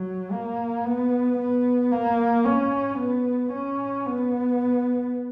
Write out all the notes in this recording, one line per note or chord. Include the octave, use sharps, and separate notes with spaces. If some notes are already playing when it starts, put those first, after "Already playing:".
Already playing: F#3
A#3
B3
B3
A#3
C#4
B3
C#4
B3